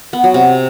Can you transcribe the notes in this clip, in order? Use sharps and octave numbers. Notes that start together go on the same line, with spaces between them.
B3
F#3
C3